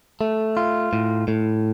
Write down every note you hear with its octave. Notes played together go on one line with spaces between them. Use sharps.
A3
F4
A2
A2